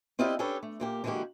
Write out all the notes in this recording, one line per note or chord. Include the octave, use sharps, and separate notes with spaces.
C4 E4 F4 G4 D5 D#5
C#4 D4 G4 A4 B4 C#5
A3
A#2 A#3 G4
D3 E3 G#3 A#3 F#4 G4